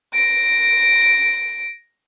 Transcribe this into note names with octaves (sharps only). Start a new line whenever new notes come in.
A#6 D7